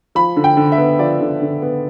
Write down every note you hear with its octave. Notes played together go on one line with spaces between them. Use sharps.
F3 B5
D3
G5
D3
E5
B3
F3 D5
D3
D3
B3